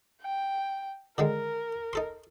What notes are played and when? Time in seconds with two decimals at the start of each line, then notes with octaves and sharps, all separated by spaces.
0.21 G5
1.18 D3 D#3 G#3 A#4
1.93 D#4 A4 C6